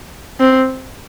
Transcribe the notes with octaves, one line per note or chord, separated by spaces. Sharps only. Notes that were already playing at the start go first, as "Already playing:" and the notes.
C4